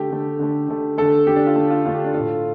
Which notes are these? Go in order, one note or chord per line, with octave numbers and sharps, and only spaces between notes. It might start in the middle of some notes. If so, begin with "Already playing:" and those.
Already playing: D3 A3 G4
D3 A3
D3 A3
D3 A3
D3 A3 A4
D3 A3 G4
D4
F4
D3 A3
F4
D3 A3 F4
G4
D4
A2 A3 F4